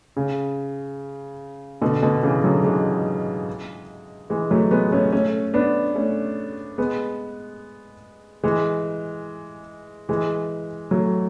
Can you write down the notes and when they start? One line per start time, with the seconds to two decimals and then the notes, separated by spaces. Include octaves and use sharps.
0.17 C#3
1.82 B2 D3
2.02 B2 D3
2.23 C#3 E3
2.44 D3 F#3
2.64 E3 G#3
4.30 E3 G#3
4.51 F#3 A3
4.71 G#3 B3
4.92 A3 C#4
5.12 A3 C#4
5.54 B3 D4
5.95 A3 C#4
6.78 G#3 B3
8.44 E3 G#3
10.09 E3 G#3
10.91 F#3 A3